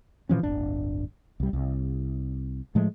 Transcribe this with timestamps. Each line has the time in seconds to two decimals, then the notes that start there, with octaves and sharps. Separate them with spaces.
0.29 A#2 E3 F3 C#4
0.43 D1 G1 D4
1.40 C2 G3
1.53 C2
2.75 A2 F3 G#3 A3